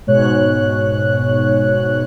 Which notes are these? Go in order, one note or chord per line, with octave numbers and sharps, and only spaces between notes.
G#2 B2 C#5 F#6